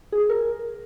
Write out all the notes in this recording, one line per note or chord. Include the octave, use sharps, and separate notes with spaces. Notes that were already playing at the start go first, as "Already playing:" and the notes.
G#4
A#4